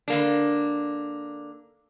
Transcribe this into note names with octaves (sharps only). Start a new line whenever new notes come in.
D3 A#3 D4